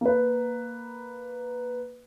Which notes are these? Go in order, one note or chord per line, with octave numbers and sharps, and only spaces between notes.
A#3 B4